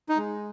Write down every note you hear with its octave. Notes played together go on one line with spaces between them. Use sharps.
D#4
G#3